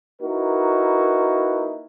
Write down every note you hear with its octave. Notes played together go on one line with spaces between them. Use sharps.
A#3 D#4 E4 F#4 A#4 B4